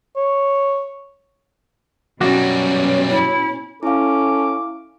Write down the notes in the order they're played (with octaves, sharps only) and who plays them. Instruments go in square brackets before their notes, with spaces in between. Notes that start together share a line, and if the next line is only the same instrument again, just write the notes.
[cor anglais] C#5
[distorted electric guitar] F#2 G3 [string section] B2 C#4 [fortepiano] F#4
[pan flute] E4
[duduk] C#4 [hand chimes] E4 F5 [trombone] A4 [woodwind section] D6